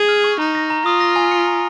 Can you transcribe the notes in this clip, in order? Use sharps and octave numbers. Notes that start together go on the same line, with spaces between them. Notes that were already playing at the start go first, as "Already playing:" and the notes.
Already playing: G#4
F6
C#6
D#4 A#5
A#6
A#5
F4 D#6
A#6
G#5
C#7
A#5